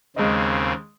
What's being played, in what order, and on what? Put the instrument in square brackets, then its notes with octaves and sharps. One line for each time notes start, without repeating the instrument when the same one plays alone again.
[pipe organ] D#2 C#3 C4 [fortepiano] G#3 D#5